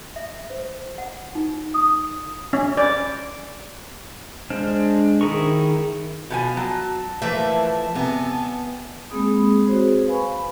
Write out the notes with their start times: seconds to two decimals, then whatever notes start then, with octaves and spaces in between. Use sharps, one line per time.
0.16 E5
0.50 C5
0.98 F#5
1.35 D#4
1.74 D#6
2.53 C#4
2.77 D5
4.50 G#3 D4 C5 F6
5.21 D#3 E4 G#4 A#4 C#6
6.30 B2 F3 G#5
6.57 F#3 A5
7.22 E3 F3 A3 A#3 B4 E5
7.95 C3 B3 G#5
9.10 G#3 A#3 C4 G#4 B5 D#6
9.67 C4 F#4 G#4 C5 C#5
10.07 B4 F5 G#5 B5 C#6